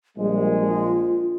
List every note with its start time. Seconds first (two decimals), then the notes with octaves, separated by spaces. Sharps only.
0.17 A#1 G3 G#3
0.68 F4